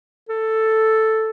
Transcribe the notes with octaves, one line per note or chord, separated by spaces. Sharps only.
A4